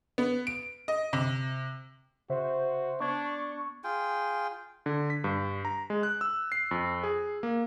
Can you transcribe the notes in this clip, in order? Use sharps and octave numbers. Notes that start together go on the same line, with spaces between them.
B3
D7
D#5
C3
C#3 F#4 C5 E5
B3 D4 C#6 G#6
F4 G#4 G5
D3
B6
G2
A#5
G#3
F#6
E6
C7
F2
G#4
A#3